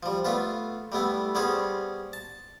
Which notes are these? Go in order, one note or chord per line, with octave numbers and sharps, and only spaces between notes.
F3 G3
A3 B3 F4 B4
G3 A3 B3 E4
G3 B3 C#4 G#4 C5
A5